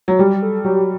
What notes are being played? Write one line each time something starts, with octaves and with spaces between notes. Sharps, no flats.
F#3
G3 G4
A4
F#3 G4